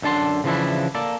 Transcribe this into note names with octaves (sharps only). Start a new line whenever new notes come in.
F#2 D3 D4 A5 C6
C#3 E3 F3 D4 E4
A#3 A4 D5